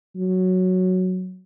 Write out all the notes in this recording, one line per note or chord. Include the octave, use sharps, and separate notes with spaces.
F#3